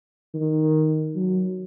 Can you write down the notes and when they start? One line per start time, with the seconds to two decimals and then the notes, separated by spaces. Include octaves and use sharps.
0.34 D#3
1.15 F#3